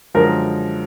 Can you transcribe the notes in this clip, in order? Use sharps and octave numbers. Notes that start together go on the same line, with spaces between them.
F#2 D3 F3 G#3 A#4